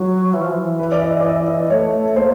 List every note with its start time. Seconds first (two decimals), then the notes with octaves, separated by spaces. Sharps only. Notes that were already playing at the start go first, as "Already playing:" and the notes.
Already playing: F#3
0.34 E3
0.41 F3
0.50 E3
0.79 B4
0.92 D5
1.02 D#5
1.20 D5
1.25 D#5
1.47 D#5
1.70 A3 C#5
2.16 A#3 C5